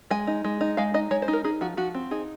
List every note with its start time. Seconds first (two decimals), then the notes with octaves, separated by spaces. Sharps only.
0.10 G#3 G#5
0.27 D#4
0.44 G#3
0.61 D#4
0.77 G#3 F5
0.94 D#4 D#5
1.11 G#3 C#5
1.22 C5
1.28 D#4
1.33 A#4
1.44 D#4 G#4
1.61 F3 F#4
1.77 F3 F#4
1.95 C4
2.11 D#4 G#4